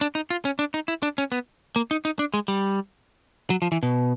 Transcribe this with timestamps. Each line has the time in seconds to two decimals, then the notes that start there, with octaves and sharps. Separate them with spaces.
0.01 D4
0.15 D#4
0.30 F4
0.45 C#4
0.59 D4
0.74 D#4
0.88 E4
1.03 D4
1.18 C#4
1.32 B3
1.76 A#3
1.91 D#4
2.05 D#4
2.19 D4
2.34 G#3
2.48 G3
3.50 F#3
3.62 F3
3.72 E3
3.83 B2